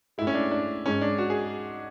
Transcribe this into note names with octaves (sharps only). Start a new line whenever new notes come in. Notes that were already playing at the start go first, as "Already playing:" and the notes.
A2 G#3 E4
C#4
D4
D4
G#2 G#3 C#4
D4
F#4
G#4